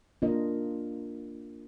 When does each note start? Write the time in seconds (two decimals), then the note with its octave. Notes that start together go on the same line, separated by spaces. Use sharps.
0.22 A#3 D4 F4 A#4 D#5